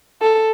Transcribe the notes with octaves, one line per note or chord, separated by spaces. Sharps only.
A4